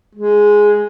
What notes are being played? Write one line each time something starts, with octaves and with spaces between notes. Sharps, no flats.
G#3